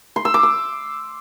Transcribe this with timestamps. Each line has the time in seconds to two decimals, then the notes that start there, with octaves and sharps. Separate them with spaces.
0.16 C6
0.25 E6
0.34 D6
0.43 E6